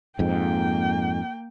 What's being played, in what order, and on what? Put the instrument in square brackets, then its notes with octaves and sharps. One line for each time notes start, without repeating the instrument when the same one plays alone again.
[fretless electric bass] F2 G#2 [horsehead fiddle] A#3 G5